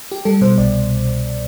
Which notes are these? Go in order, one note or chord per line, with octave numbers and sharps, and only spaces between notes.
G4
G3 A4
B2 C5
C2 D5